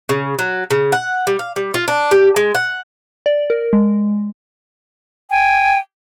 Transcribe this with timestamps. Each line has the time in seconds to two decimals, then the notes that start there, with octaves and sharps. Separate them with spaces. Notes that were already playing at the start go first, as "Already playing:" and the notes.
0.09 C#3
0.39 F#3
0.71 C#3
0.92 F#5
1.27 G3
1.39 F5
1.56 G3
1.74 F4
1.88 D4
2.11 G4
2.36 G#3
2.55 F#5
3.26 D5
3.50 A#4
3.73 G#3
5.30 G5 G#5